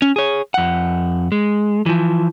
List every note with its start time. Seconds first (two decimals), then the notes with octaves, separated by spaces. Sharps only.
0.02 C#4
0.16 G#4 C#5
0.54 F2 F#5
1.32 G#3
1.86 E3 F3